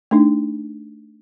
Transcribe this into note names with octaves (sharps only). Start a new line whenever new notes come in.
A3 D4 D#4